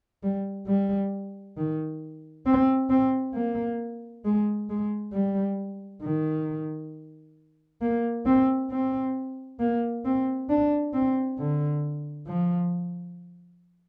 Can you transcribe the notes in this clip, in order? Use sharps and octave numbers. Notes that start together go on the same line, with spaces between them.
G3
G3
D#3
C4
C4
A#3
G#3
G#3
G3
D#3
A#3
C4
C4
A#3
C4
D4
C4
D3
F3